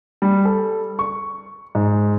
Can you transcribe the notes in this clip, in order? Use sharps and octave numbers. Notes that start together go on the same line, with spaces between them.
G3
A4
C#6
G#2